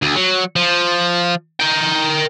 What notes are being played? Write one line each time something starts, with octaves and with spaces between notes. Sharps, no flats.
D2
F#3
F3
A#4 G5